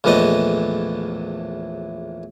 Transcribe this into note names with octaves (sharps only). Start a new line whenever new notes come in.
A#1 E2 A2 E3 A4 D#5